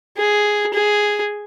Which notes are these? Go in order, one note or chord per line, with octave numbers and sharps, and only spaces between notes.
G#4
G#4